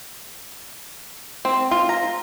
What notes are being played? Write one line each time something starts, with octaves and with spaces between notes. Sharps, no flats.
C4
F4
A#5